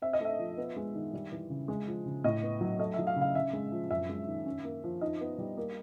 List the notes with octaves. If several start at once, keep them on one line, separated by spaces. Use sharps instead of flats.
C4 E5
D#5
A3 E5
F3
B3
G#3
D#3
G3
E3
C#3
G#3
F3
C#3
A2 D#5
B3
F#3
A3 D#5
E5
F#3
F5
C#3
F5
C#3 E5
G#3
F3
F#2 E5
G#3
D#3
C#4
A#3
F3
D#4 D#5
B3
G3
A#3